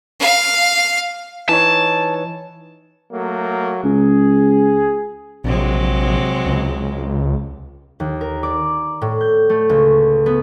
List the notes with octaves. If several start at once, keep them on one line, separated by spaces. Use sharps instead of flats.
F5
E3 D#4 C#5 A5
F#3 A3 A#3
C#2 G#4
A#1 C3 F#3 G#3
C#2
D#2
A#4
D5
A2
G6
A3
C#2
B3